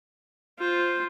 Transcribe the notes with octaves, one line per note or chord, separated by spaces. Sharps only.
F4 C5